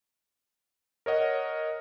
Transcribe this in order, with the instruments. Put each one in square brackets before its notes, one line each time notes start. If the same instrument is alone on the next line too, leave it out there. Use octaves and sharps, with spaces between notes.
[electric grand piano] A#4 C#5 D#5 F#5